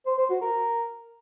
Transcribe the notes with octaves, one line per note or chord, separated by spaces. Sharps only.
C5
C5
F#4
A#4